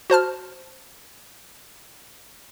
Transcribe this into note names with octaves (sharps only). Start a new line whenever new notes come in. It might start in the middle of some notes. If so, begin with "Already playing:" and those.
F#4 C5 A5 F6